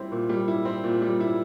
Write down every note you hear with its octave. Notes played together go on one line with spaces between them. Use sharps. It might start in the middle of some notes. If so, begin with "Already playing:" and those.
Already playing: G3 C4 E4
A#2
G3
E4
C4
A#2
G3
E4